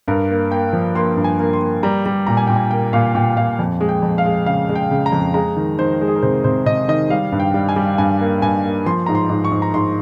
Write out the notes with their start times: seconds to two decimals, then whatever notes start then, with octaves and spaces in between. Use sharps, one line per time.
0.08 G2 A#4
0.30 A#3
0.51 A#3 G5
0.73 F3
0.95 A#3 C6
1.17 G2
1.24 G#5
1.40 A#3
1.53 C6
1.61 A#3
1.83 G3 A#5
2.06 G3
2.27 A#2 A#5
2.37 G#5
2.47 A#2 G5
2.56 G#5
2.71 A#3 G5
2.93 A#2 F5
3.15 A#2 G5
3.37 A#2 F5
3.59 F2
3.81 G#3
3.89 G5
4.02 F2
4.18 F5
4.25 G#3
4.46 C#3 F5
4.69 G#3
4.75 G5
4.91 C#3
5.06 A#5
5.12 F2
5.34 G#3 A#5
5.56 D#3
5.79 D#3 C5
6.01 G#3
6.08 G#4
6.16 A#4
6.22 C3 C5
6.44 C3 C5
6.66 C3 D#5
6.88 D#3 D#5
7.10 G3 F5
7.32 G2
7.40 G5
7.54 G3
7.69 G#5
7.76 G3
7.98 G2 G#5
8.20 A#3
8.42 G2 G#5
8.64 A#3
8.86 F3 C6
9.06 G#2 A#5
9.15 C6
9.30 G#2
9.45 C#6
9.52 G#2
9.62 A#5
9.74 G#2 C6